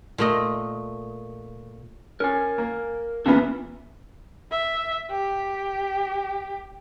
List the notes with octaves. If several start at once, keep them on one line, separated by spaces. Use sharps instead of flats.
A#2 A3 D#5
C#4 A#4 G#5
A#3
E2 A#2 B3 C#4 D4
E5
G4